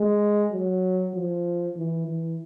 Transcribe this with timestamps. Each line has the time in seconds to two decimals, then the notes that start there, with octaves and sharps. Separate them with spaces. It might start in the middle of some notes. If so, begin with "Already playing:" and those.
Already playing: G#3
0.52 F#3
1.14 F3
1.76 E3
2.08 E3